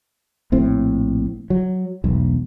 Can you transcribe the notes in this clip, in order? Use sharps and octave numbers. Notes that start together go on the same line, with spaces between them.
A#1 A2 C4
F#3
E1 B1